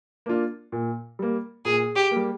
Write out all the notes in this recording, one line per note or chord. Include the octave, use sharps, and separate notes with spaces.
A#3 D4 F4
A#2
G3 A#3
A#2 G#4
G4
G3 A#3